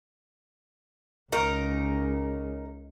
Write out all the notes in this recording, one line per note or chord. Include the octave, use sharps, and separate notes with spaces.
C#2 C#3 D#4 A#4